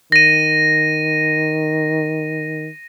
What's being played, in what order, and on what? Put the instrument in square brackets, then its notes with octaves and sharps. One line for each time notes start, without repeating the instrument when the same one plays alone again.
[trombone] D#3 [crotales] A#6 D#7